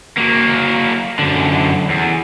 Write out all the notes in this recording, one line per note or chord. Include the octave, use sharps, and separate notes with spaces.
F#3 A#3
F#2 D3
E2